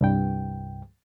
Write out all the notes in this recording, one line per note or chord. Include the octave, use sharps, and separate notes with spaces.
C2 G2 G5